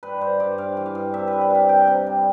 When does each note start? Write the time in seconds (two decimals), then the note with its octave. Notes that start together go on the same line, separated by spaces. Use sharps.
0.03 G2 B4
0.21 G2 C5
0.40 G2 D5
0.58 G2 F5
0.77 E3
0.86 F5
0.95 G2
1.14 C3 E5
1.27 B4
1.33 G3
1.41 B4
1.50 C3 F5
1.69 C3 G5
1.87 C3
2.06 G3